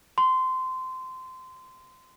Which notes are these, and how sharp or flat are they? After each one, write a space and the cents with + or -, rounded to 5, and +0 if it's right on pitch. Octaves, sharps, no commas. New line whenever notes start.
C6 -20